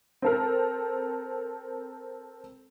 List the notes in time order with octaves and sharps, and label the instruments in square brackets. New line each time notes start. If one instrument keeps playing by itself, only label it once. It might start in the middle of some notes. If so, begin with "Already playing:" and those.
[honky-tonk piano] C4 A4 A#4